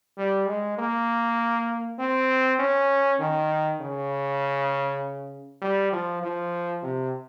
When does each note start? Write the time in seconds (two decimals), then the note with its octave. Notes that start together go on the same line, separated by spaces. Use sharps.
0.17 G3
0.48 G#3
0.78 A#3
1.99 C4
2.59 C#4
3.20 D#3
3.81 C#3
5.62 G3
5.93 F3
6.23 F3
6.83 C3